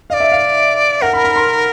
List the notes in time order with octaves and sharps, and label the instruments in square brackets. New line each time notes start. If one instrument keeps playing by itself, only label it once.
[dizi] D#5 [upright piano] F5
[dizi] D5
[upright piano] E5
F5
[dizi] A#4 [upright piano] F#5
[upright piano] B5
B5
C6